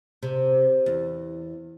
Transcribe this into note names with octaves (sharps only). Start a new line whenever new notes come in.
C3
E2